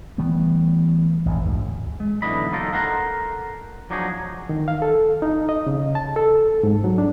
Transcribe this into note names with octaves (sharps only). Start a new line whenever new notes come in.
E3 G3 A3 B3
A1 F2 A2
D2 G#2
G#3
B1 D3 E3 D#5 B5
F#3 A#3 D#4 F4 A4 A#4
A4 A#4 C5 F#5 A#5
F3 F#3 D4 D#4 F#4 G#4
D#3
F5
A4
D#4
D#5
C#3
A5
A4
G#2
F#3
D4